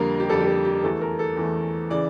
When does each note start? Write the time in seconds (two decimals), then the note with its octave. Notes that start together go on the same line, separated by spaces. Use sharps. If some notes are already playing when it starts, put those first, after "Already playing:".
Already playing: F2 D3 G3 A#3 A#4
0.20 G4
0.29 F2 D3 G3 A#3 A4
0.41 G4
0.47 A4
0.65 G4
0.83 E2 E3 A3 A4
1.01 A#4
1.19 A4
1.37 E2 E3 A3
1.90 C#3 E3 D5